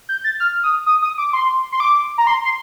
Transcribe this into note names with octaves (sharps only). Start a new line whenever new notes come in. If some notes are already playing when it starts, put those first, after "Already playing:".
G6
A6
F6
D#6
D#6
D#6
D6
C6
C6
D6
A#5
C6
C6